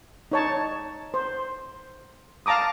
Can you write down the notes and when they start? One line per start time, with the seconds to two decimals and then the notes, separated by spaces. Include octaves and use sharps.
0.32 D#4 C#5 A5
1.14 C5
2.46 F5 A5 A#5 D6 D#6